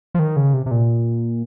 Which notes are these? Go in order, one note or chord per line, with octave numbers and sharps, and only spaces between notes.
F3
D#3
C#3
C3
C3
A#2